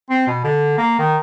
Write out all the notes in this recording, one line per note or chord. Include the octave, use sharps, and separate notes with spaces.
C4
B2
D3
A#3
D#3